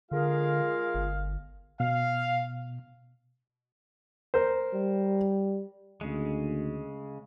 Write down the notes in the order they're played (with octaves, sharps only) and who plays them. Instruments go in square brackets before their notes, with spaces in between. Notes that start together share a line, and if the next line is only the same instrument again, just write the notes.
[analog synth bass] D3 [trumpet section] G#3 F5 [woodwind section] F4 G#4 A#4
[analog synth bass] G1
[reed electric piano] B2 [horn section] F5
[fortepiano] A#4 C5
[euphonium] G3
[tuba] D2 [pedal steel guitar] C#3 G#3